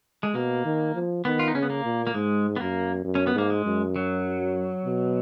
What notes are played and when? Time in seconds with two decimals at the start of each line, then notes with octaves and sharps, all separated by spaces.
0.23 G#3
0.34 B2 A#3
0.65 D#3
0.95 F3
1.25 D#3 B3
1.39 F4
1.48 D#4
1.54 C#3 C#4
1.62 B3
1.70 A#3
1.85 A#2
2.07 A#3
2.14 G#2 G#3
2.56 B3
2.60 F#2 A#3
3.04 F#2
3.15 C#4
3.27 B3
3.35 G#2 A#3
3.50 G#3
3.65 F#2
3.96 F#3
4.85 B2